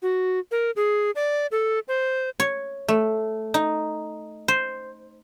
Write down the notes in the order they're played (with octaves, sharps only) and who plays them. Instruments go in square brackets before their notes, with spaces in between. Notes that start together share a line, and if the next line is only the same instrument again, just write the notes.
[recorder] F#4
A#4
G#4
D5
A4
C5
[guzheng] C#5
A3
D#4
C5